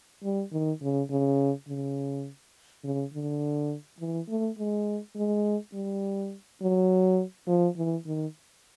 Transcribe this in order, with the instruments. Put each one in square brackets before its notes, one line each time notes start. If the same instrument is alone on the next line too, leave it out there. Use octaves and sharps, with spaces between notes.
[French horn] G3
D#3
C#3
C#3
C#3
C#3
D3
E3
A3
G#3
G#3
G3
F#3
F3
E3
D#3